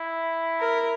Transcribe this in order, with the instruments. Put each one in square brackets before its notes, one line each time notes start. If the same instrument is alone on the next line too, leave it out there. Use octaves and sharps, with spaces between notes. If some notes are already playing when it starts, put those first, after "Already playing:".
Already playing: [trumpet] E4
[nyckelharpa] A#4